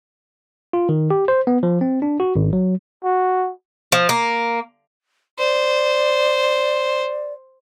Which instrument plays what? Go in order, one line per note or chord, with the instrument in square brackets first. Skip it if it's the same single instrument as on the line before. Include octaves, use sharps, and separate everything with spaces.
[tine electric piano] F4
D#3
G4
C5
B3
F3
C4
D4
F#4
G#1
F#3
[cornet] F#4
[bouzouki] F3
A#3
[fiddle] C5 [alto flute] D5